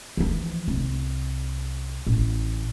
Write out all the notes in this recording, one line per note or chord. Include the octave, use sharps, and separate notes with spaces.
E3 F3
C2
A1